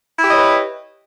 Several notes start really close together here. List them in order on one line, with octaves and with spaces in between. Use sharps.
E4 G4 D#5 C#5 B4